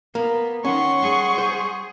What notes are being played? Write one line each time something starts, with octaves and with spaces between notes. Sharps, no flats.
A#3 B3
D#3 C#4 F#5 C6 C#6
G3 G#4
C5